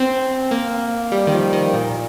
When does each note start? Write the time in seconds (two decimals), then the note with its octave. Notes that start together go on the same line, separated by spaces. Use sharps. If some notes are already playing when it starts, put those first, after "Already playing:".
Already playing: C4
0.51 A#3
1.12 G3
1.27 D#3
1.32 F3
1.53 D#3
1.74 A#2